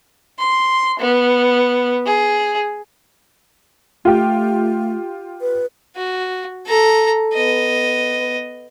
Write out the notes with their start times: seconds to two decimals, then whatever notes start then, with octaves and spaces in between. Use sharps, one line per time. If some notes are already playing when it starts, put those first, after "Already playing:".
0.39 C6
0.99 B3
2.06 G#4
4.05 A3 F4 G4
5.41 B4
5.96 F#4
6.66 A4 A#5
7.34 B3 D#5